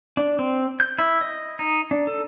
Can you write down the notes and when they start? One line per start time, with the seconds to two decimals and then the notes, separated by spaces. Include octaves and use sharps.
0.17 D4
0.39 C4
0.80 G6
0.99 E4
1.21 D#5
1.59 D#4
1.91 D4
2.07 A4